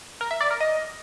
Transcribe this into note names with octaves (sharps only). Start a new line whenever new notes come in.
A#4
E5
D5
A#4
D#5